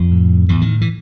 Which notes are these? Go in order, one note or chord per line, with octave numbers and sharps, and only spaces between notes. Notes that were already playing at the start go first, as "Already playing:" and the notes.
Already playing: F2 F3
A2
E2 A2 E3
D#3
E3